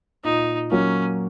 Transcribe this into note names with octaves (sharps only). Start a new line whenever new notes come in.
A#2 D#4
F#3 A#3 C#4